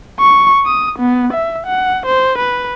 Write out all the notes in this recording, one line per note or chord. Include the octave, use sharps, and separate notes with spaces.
C#6
D#6
B3
E5
F#5
C5
B4